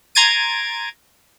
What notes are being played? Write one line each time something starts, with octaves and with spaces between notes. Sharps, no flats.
A#5 C6 G#6 A6 D7 D#7